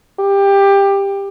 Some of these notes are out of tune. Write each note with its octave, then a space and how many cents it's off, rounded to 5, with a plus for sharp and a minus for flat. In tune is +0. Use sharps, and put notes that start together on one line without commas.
G4 +20